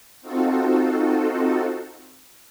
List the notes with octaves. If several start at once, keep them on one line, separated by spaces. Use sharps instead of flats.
C4 D#4 F4 F#4 A4